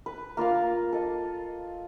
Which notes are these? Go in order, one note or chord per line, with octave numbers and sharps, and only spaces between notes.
B4
A#3 F4 A#4 F5
A4 D#5